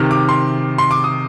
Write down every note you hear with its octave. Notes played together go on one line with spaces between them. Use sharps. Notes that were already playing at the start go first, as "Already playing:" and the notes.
Already playing: C3 D#3 F6
D6
C6
C6
D6
D#6